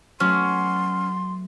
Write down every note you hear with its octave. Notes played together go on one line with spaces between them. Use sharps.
F#3 A3 B3 C#4 C6